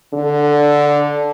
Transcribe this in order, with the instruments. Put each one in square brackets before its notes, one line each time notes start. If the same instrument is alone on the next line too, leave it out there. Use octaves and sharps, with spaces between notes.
[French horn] D3